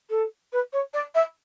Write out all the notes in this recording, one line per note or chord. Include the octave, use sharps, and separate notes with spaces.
A4
B4
C#5
D5
E5